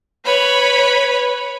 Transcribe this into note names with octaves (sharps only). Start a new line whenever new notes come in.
B4 C#5 B5